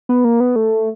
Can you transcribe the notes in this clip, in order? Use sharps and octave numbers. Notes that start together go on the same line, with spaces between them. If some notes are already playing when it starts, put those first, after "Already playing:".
B3
A#3
B3
A3